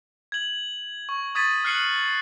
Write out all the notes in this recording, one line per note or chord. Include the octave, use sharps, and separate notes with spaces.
G#6 F#7
C#6
C#6 D#6 G#6 A6 B6 D#7
F6 F#6 C7 C#7 D#7 F#7